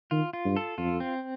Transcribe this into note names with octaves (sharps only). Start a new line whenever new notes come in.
D#3 F4
F4
G2
A4
F2 F4
C4